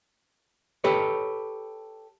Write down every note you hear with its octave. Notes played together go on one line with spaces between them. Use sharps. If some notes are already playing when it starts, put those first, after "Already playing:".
G4 A4 B4 C#5